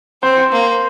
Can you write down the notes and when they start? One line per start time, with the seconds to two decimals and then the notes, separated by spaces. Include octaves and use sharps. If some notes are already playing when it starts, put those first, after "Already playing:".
0.22 C4 C5
0.52 A#3